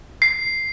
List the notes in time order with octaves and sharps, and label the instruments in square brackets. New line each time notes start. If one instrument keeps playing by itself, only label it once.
[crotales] C7